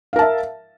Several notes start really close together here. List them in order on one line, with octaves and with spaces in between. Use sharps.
F5 A#4 A5 E5